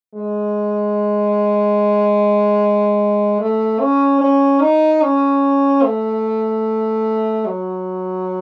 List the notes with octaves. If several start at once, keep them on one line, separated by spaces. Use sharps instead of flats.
G#3
A3
C#4
C#4
D#4
C#4
A3
F#3